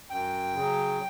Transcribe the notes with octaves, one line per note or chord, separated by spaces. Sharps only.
F#2 G5
C#3
F#3